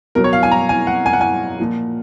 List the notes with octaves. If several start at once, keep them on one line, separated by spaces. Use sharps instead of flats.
B2 F#3 A#4
C#5
F5
G#5
A#5
G#5
F#5
G#5
F#5
G#5
A#2 F3